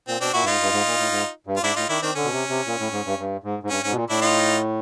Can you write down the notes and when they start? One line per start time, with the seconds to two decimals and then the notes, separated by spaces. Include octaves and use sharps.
0.08 A#2 C4
0.21 B2 C4 D4
0.34 A#2 E4 F#4
0.42 G2
0.46 G#2 D#4 F4
0.61 G2
0.73 G#2
0.86 A#2
0.99 A2
1.11 G#2
1.47 G2
1.57 F4
1.63 G#2 D4 E4
1.76 A2 D#4 F4
1.89 D#3 D4 E4
2.02 D#3 C4 D4
2.15 D3 C#4
2.24 B2
2.32 C3
2.49 C3
2.67 A#2
2.79 A2
2.92 G#2
3.05 G2
3.19 G2
3.44 G#2
3.63 G#2
3.70 G2 C#4
3.83 G#2 C#4
3.92 B2
3.96 A#2
4.10 A2 D4 E4
4.21 D#4 F4